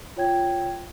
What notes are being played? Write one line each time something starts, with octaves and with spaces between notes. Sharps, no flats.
F4 C#5 G5 G#6